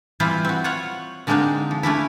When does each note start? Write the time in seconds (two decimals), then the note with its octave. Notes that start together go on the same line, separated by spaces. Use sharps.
0.20 E3 G3 C4 E4 F4
0.45 C4 F#4
0.64 F4 C#5 F#5
1.27 D3 G#3 A#3 C4 D4 D#4
1.71 F3
1.83 A3 C#4 D4 E4